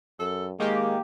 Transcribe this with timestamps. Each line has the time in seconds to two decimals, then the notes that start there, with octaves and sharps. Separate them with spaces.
0.19 F#2 A4
0.60 D#3 G#3 A#3 G4